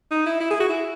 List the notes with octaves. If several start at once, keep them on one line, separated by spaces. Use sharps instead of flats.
D#4
E4
E4
G#4
F#4
E4